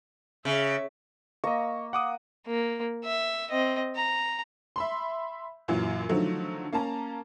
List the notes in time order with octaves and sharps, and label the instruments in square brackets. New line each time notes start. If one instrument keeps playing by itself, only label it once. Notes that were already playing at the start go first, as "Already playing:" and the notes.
[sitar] C#3 [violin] E5
[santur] A#3 A#5 E6 [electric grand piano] D#5 C#6
[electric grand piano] F#5 D6 D#6
[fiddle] A#3
E5
C4 D#5
A#5
[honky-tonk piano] E5 B5 C6
F#2 A#2 E3 F#3
D3 D#3 F3 F#3 A3
A#3 C#4 A5 A#5